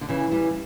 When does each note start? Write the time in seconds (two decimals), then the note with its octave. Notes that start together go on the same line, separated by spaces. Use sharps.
0.01 D3
0.09 C#3 E3
0.31 E3 G3